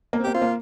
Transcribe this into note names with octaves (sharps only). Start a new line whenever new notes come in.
A#3
C4
A#3 G4
C4 F4
A#3